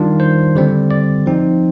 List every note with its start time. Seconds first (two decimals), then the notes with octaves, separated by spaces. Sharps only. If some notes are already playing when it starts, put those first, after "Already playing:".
Already playing: D#3 G3 D4 F4
0.20 C5
0.55 D3 G3 C4
0.91 D5
1.26 F3 C4 D#4